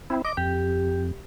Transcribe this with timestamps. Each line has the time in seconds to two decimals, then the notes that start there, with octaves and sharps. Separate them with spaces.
0.10 C4 E4
0.25 D#5 D6
0.37 F2 G4